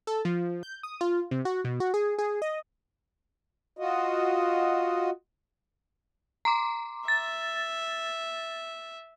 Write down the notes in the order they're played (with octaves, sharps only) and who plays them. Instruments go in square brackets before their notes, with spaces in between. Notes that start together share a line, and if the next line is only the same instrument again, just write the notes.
[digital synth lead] A4
F3
G6
D#6
F4
C3
F#4
B2
F#4
G#4
G#4
D#5
[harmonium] F4 F#4 D#5
[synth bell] A#5 C6 D6
[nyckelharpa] E5 [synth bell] A6